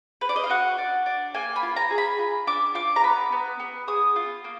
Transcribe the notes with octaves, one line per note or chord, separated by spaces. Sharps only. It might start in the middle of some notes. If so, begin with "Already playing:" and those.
B4
D5
D#5
F5
F#4 F#5
D4
D4
A#3 G#5
B5
F4
A#5
G#4
B5
F4
D4 D6
F4 D6
A#5
B3 B5
B3
B3
G#4 D#6
F4
A#3